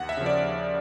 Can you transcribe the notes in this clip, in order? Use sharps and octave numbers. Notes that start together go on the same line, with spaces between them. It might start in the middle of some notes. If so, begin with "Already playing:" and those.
Already playing: D#2 F#5
E5
C#3 F3
D5
D#2